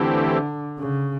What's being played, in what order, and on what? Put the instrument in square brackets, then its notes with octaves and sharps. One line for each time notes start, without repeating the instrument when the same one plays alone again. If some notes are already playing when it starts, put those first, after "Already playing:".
Already playing: [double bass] D3 [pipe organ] E3 A3 C4 E4 G4
[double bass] C#3